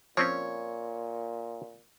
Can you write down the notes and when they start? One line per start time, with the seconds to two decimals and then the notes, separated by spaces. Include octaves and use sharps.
0.17 A#2 F3 C4 C#4 C#5